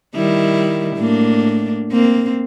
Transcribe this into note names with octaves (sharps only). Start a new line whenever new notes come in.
D#3 G3 E4
A2 A#3 D4
A#3 C4